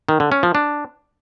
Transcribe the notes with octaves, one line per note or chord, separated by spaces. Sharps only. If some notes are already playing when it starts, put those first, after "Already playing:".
D#3
D3
C#4
F3
D4